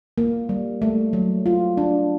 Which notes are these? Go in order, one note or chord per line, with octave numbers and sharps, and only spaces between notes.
A#3
G3
A3
F#3
F4
D4